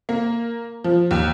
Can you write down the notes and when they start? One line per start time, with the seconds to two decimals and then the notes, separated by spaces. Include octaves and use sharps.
0.09 A#3
0.84 F3
1.11 D#2